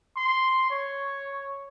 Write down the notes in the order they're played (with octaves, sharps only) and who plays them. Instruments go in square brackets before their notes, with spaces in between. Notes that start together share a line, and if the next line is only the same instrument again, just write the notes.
[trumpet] C6
C#5